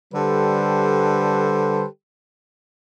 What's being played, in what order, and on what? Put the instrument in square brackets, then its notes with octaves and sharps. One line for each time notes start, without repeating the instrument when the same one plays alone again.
[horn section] D3 G3 G4 A4 B4 C5